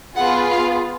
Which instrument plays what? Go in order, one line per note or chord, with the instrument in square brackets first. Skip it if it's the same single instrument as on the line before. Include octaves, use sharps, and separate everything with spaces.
[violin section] B3 F4 G#4 F#5
F5